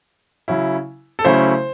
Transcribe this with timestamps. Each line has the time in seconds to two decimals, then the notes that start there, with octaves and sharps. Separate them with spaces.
0.48 C#3 F#3 C#4 E4
1.19 A4
1.24 C#3 F#3 A3 C#4 E4 C5